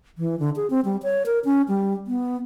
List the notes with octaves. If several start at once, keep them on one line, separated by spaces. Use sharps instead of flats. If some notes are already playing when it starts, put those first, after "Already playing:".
E3
D3
G#4
C4
G3
C#5
A#4
C#4
G3
B3